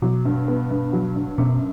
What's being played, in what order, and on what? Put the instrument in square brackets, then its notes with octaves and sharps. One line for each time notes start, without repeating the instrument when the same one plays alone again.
[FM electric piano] B2 [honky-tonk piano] F#3
[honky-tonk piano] G2
B3
G2
F#3
G2
[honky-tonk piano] F#2 [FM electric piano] B2